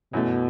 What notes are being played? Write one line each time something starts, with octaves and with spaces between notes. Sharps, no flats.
F#2 B2 E3 A3